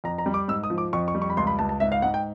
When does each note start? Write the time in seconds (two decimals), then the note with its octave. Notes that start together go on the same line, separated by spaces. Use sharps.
0.04 F2 A#5
0.18 A#5
0.26 G3
0.34 D6
0.48 G#2 E6
0.64 D#6
0.70 F3
0.78 D6
0.93 F2 C#6
1.08 C#6
1.15 G3
1.22 C#6
1.30 B5
1.37 C#2 C6
1.47 B5
1.59 C#2 A5
1.69 A5
1.80 G#2 E5
1.92 F5
2.02 G#2 F#5
2.14 G5